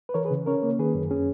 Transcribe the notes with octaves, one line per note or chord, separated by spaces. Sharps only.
B4
E3 A#4 C#5
G#4 B4
C#3
C#4 A#4 C#5
A#3
D#3 G#4 B4
F#2
C#4 G#4